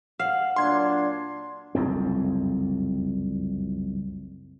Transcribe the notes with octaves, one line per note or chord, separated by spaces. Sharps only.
F5 F#5
A#2 F#3 D4 C6 G#6
F#1 C2 F2 C4